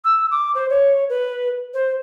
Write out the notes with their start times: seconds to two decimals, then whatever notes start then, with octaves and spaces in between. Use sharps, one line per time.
0.05 E6
0.31 D6
0.55 C5
0.70 C#5
1.10 B4
1.74 C5